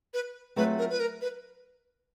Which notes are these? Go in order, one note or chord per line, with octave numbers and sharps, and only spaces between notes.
B4
F#3 A3 C4 F4 G#4 B4
A#4
B4
A#4
B4